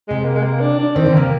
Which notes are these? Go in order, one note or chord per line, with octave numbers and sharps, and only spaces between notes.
C3 G#3
A#3
G#3
A#3
D4
D4
D#3 C4
D3
C3 A#3